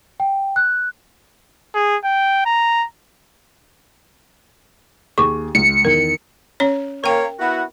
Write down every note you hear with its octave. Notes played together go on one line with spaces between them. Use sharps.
G5
F#6
G#4
G5
A#5
D#2 G#4 C#6 D6
C#2 C#7
E2 D#3 A#4
C#4 C#5
A#3 A#4 C#5 G5
B3 E4 F#4